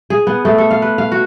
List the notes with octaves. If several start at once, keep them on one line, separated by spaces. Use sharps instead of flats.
G#4
B3
A3
A4
F5
B4
F5
F#4